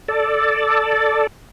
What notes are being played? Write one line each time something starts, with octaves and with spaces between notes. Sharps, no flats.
A4 D5